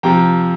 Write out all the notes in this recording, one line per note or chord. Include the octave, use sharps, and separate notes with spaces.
F2 C3 F3 G5 A#5